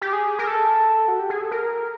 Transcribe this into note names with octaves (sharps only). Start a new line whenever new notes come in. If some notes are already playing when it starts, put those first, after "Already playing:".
G4
G#4
A#4
A4
F#4
G4
G#4
A4
A#4